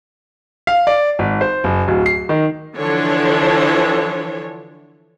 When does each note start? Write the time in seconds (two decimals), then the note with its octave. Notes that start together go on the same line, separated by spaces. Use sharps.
0.67 F5
0.87 D5
1.19 G#1
1.41 C5
1.64 F#1
1.88 D1
2.06 C7
2.29 D#3
2.76 D3 E3 F3 D4 C#5